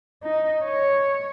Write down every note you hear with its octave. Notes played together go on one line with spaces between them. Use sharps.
D#4
C#5